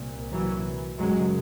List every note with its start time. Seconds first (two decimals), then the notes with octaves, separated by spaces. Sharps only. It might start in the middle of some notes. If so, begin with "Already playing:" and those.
Already playing: C2 A#2
0.30 E3 F#3
0.97 F#2 C#3 F#3 G#3